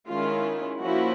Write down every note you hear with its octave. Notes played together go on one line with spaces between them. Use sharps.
D#3 G#3 C#4 E4 F4
F3 A#3 C#4 E4 F#4